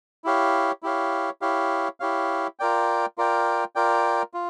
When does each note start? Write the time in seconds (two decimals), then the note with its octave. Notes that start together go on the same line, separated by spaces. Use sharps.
0.24 E4 G4 C#5 F5
0.83 E4 G4 C#5 F5
1.42 E4 G4 C#5 F5
2.00 E4 G4 C#5 F5
2.59 F4 A#4 D5 G5
3.18 F4 A#4 D5 G5
3.75 F4 A#4 D5 G5
4.34 F4